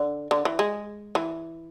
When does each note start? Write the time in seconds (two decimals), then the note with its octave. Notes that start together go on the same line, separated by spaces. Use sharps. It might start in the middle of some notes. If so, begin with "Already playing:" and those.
Already playing: D3
0.31 D3
0.45 E3
0.59 G#3
1.15 E3